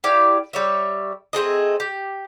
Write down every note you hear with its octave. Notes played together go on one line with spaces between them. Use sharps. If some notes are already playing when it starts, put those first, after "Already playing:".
E4 G4 D5 F5
G3 C#5 E5
A3 C4 G#4 D#5
G4